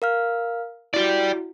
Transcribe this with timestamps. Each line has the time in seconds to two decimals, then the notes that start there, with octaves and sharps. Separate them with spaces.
0.02 A#4 F5 F6
0.94 E4 F#4 G4 D5